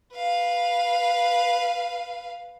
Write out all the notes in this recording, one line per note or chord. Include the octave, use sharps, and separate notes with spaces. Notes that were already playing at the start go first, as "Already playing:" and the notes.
B4 F5